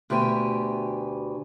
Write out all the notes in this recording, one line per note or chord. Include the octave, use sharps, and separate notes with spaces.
D2 B2 G4 G5 G#5